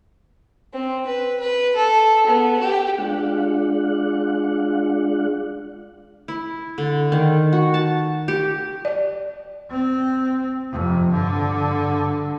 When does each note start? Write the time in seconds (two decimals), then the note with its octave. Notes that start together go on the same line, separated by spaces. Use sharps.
0.73 C4
1.07 B4
1.40 B4
1.76 A4
2.27 B3
2.59 G4
2.98 G#3 D4 F4 F#5
6.28 E4
6.78 D3
7.12 D#3
7.53 F#4
7.74 A5
8.28 G4
8.85 D5
9.70 C4
10.72 F2 C3
11.09 G2 D3